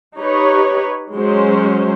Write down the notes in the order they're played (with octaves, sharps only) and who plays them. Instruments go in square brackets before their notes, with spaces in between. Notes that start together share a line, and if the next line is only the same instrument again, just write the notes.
[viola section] D#4 G4 B4 C#5
F#3 G#3 C#4 C5